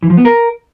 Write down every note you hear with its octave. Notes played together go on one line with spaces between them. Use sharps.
E3
F3
B3
A#4